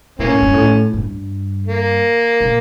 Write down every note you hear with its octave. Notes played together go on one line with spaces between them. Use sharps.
A#2 E3 A#3 C#4
A2
G2
A2
G2
A#3
A#2